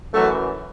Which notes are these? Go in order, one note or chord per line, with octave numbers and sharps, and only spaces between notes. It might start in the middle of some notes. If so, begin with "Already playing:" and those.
F#2 E3 F#3 A3